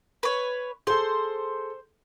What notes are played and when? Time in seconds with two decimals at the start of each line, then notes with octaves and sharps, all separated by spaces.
0.23 B4 C#5
0.87 G#4 A4 C5